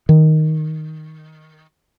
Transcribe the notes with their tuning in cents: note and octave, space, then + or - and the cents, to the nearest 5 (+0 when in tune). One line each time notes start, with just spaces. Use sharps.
D#3 +5